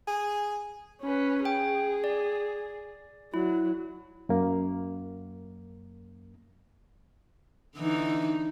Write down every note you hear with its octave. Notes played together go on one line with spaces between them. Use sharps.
G#4
C#4 B4
G#4 G5
D5
F#3 E4
F#2 A#3
D3 E3 D#4